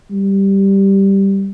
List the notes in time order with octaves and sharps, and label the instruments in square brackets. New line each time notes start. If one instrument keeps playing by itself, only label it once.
[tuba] G3